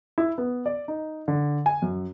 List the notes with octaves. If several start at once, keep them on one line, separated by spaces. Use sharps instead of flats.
E4
B3
D5
D#4
D3
G#5
F#2